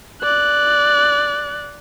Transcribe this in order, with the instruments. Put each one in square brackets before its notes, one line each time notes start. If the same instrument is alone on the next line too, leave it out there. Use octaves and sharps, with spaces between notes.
[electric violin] D5 F#6